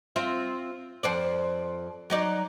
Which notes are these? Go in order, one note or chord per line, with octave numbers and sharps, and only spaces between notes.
C4 F4 E5
F2 C5 D5
F#3 D#4 D5